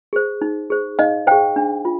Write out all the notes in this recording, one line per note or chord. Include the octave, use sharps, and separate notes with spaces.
G#4 C5
D#4
G#4 C5
D#4 D#5 F5
G#4 C5 F5 G5
D4
F4